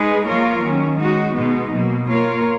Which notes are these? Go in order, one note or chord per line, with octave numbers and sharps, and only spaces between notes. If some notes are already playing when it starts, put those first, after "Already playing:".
Already playing: G#3 D#4 G#4 B4
F3 A#3 F4 A#4 C#5
D#3 F#3 C#4
G#3 D#4 F#4
B2 G#3 B3 D#4
B2 F#3 A#3
A#3 F4 A#4 C#5